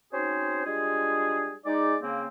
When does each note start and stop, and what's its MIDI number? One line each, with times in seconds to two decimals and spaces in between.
0.13 0.64 60
0.13 0.64 61
0.13 0.64 63
0.13 0.64 66
0.13 0.64 68
0.13 0.64 72
0.66 1.54 55
0.66 1.54 56
0.66 1.54 62
0.66 1.54 65
0.66 1.54 68
1.66 1.97 56
1.66 1.97 63
1.66 1.97 74
2.03 2.27 49
2.03 2.27 58
2.03 2.27 60